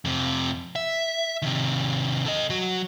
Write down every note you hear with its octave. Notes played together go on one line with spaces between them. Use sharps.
F2 C3
E5
C3 D#3
A4 D#5
F#3 F#4